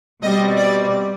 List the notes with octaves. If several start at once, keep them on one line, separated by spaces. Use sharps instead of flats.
B2 G3 C4 D#5
D5